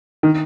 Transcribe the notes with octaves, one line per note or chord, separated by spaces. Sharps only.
D#3